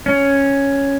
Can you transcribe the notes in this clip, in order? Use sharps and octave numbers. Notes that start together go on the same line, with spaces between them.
C#4